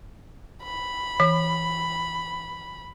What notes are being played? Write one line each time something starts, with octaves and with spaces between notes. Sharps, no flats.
B5
E3